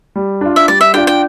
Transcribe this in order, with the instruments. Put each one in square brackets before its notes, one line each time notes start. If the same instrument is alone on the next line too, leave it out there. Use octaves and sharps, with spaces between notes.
[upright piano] G3
D4 F4
[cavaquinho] E5
[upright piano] G3 [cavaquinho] D5
[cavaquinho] E5
[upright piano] D4 F4 [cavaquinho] G5
[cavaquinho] G5